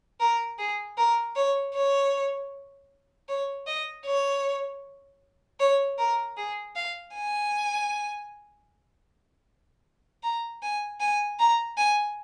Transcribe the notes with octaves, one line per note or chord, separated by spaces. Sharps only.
A#4
G#4
A#4
C#5
C#5
C#5
D#5
C#5
C#5
A#4
G#4
F5
G#5
A#5
G#5
G#5
A#5
G#5